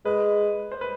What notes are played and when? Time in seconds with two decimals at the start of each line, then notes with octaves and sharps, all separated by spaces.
0.05 G#3 B4
0.72 C5
0.81 B4